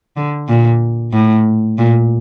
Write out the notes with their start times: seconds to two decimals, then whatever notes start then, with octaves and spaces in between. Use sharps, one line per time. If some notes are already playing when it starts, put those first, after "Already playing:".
0.16 D3
0.48 A#2
1.13 A2
1.78 A#2